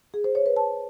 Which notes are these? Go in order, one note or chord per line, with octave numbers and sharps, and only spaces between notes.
G#4
C5
C#5
B4
A5